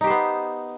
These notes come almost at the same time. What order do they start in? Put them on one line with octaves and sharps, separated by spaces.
D#4 G4 C5 B3